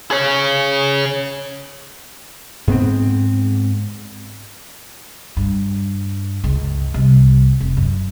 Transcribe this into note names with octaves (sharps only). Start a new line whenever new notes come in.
G#4 C#5
G#2 B3 C4
G2
C#2
C2
F1
F#2